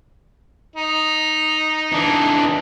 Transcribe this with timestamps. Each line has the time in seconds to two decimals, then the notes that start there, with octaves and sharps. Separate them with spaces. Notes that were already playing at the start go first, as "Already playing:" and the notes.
0.76 D#4
1.92 E3 D4